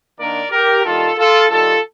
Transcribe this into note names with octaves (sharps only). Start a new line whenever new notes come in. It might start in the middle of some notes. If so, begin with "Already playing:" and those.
D#3 A#3 D4 A#4 D5
G4 A#4
D#3 G3 D4 F4 A4
F4 A4
D#3 G3 D4 F4 A4